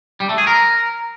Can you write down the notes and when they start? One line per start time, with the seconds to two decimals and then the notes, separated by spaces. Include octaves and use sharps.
0.20 G3
0.29 A3
0.38 G#4
0.47 A#4